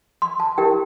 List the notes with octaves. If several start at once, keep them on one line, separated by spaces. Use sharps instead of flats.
C6
A5
E4 G4 A#4 G5